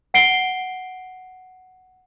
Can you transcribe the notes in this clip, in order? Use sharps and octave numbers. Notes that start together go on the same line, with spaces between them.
F#5 C7 D7 G7